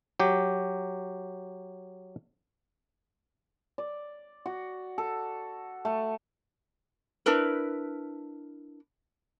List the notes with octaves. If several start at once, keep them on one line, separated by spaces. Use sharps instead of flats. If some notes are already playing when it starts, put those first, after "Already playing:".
F#3 G4
D5
F#4
A4
A3
D4 E4 A#4 B4